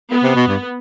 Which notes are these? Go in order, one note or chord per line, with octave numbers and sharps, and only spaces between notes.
B3
C3
B2
G2